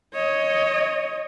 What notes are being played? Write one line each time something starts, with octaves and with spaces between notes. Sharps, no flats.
C#5 D#5